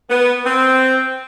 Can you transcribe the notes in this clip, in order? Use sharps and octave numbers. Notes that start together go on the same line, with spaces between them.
B3
C4